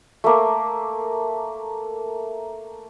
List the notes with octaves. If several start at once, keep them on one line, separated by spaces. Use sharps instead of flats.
A3 A#3